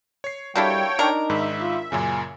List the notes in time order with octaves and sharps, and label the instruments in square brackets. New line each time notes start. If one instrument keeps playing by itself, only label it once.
[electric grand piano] C#5 C7
[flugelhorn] G3 [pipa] A#3 D4 E4 [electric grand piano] F#4 A4 [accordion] C#5 G5
[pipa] D4 A#4 [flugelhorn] D#4
[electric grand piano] G#2 D#3 B5 [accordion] E5
[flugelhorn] F4
[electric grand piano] F#2 A#2 C#3 [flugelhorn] G#5